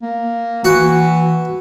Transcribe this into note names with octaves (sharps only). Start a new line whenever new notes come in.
A#3
E3 F#4